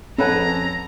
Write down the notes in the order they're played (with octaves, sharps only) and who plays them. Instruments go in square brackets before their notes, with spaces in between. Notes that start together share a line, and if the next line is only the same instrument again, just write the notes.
[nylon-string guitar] F2 C#5 A5 [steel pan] C#4 [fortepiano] A4 B4 F#5 [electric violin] A#5